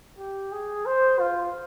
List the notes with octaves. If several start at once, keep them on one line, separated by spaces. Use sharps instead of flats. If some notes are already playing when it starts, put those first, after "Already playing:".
G4
G#4
C5
F4